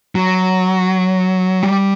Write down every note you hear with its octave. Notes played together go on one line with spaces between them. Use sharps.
F#3
G3